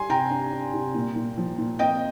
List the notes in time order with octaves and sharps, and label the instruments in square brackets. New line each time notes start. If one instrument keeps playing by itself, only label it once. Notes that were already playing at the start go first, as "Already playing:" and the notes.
Already playing: [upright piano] G3 [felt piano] G#5 C6
[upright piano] C3 [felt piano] G5 A#5
[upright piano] D4
D4
C3
A#2
A#2
F3
A#2
[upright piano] C4 [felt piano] D#5 G5